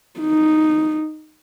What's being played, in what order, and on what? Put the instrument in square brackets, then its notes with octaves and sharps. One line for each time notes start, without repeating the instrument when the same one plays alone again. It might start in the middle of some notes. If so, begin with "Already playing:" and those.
[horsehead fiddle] D#4